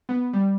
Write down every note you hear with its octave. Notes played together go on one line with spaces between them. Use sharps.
B3
G3